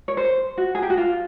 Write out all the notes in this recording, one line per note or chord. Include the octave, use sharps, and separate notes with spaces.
C#5
C5
F#4
G#4
G4
F#4
F4